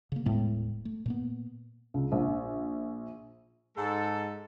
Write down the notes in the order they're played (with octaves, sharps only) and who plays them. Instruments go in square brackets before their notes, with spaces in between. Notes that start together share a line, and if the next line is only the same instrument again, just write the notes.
[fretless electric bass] C#3 A#3
D#1 A2 G#3 B3
A3
A#2 A#3 B3
[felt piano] C#2
A#1
[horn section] G#2 G#3 A4